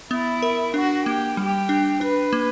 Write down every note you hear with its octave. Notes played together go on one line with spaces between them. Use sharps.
B3 E4
A#4
D4 F#4
A#3 G4
G3 G4
D4
D4 B4
A#3